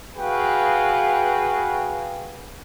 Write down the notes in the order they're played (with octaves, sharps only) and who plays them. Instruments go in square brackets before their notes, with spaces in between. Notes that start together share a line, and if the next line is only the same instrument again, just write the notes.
[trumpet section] F#4 G#4 B4 F5 G5